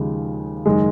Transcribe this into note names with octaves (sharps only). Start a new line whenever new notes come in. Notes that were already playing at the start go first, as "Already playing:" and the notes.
Already playing: D#2 C#3 F3 G#3
F#1 D#3 G#3